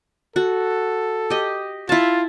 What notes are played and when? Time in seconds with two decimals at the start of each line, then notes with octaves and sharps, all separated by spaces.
0.36 F#4 A4
1.30 G4 D#5
1.89 E4 F4 A5